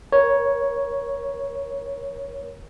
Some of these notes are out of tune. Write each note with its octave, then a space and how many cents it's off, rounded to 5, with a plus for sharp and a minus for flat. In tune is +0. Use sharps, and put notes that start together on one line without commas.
A#4 +30 C#5 +0